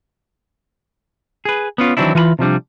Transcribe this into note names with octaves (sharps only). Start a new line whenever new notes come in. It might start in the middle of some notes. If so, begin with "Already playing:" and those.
G#4 B4
B3 C#4 F4
D#3 E3 F#3 C4 D4 E4
E3 F4 G#5 B5
C3 F3 G3 D4